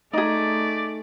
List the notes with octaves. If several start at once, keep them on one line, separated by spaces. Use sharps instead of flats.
A3 D#4 G#4 D5